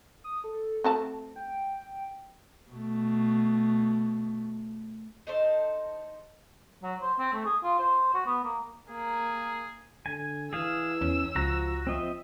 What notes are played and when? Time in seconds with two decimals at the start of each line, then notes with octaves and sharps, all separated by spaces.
0.24 D#6
0.44 A4
0.84 A3 C4 F#4 A5
1.36 G5
2.70 B2 A3
5.27 D#4 A4 C5
6.83 F#3
7.02 C5
7.19 C4
7.33 A3
7.45 G#4
7.64 F4
7.79 C5
8.14 F#4
8.27 B3
8.44 A#3
8.90 A#3 G#4
10.06 D3 G#5
10.53 E3 G#4 F5 E6
11.01 E2 C#4
11.36 C#2 F3 F#4 A#5
11.87 F3 C4 D#5 E5